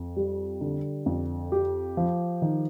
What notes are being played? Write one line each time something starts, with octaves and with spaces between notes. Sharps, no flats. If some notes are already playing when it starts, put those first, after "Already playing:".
Already playing: F2
G3
D3
F2
G4
F3
D#3